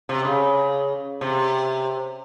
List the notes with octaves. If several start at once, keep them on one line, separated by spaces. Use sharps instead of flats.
C3
C#3
C3